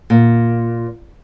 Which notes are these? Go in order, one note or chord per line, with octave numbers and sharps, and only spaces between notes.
A#2